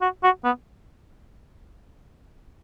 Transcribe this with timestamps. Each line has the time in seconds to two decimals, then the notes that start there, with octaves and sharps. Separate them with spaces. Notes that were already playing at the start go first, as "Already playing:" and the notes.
0.01 F#4
0.23 F#4
0.44 B3